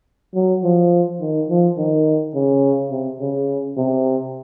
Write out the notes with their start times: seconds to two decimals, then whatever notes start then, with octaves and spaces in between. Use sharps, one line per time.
0.35 F#3
0.64 F3
1.21 D#3
1.49 F3
1.78 D#3
2.35 C#3
2.91 C3
3.20 C#3
3.77 C3